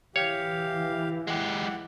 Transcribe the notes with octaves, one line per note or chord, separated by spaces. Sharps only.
E3 G4 C#5 F5
G#3 G4 F#5